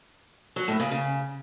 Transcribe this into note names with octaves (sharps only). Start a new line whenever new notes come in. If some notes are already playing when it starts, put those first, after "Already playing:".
F#3
A2
C#3
C#3